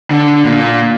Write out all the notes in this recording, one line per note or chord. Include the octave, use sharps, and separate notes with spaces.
D3
A#2